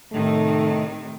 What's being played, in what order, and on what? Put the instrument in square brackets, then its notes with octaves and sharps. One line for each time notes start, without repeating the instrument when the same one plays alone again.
[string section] A2 C3 D#3 [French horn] A3